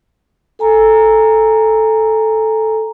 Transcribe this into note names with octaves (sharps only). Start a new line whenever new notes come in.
A4 G#5 A#5